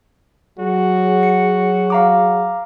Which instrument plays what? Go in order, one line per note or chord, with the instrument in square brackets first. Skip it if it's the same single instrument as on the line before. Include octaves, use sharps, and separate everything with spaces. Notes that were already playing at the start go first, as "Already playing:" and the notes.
[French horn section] F#3 G#4 [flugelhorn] F#4
[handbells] C#7
F5 A#5 D6